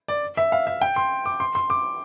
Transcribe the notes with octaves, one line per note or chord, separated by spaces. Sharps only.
D5
E5
F5
E5
G5
C6
D6
C6
C6
D6